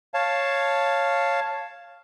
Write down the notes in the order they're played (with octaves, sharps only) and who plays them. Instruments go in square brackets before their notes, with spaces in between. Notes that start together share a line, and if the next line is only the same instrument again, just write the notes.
[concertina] C#5 F5 A5